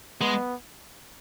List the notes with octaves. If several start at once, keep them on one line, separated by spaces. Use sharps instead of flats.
G#3 B3